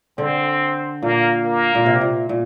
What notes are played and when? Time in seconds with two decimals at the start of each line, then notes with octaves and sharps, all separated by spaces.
0.18 D3 C4
1.03 A#2 A#3
1.44 A#3
1.75 A#2
1.86 C3
2.01 A#2
2.29 A#2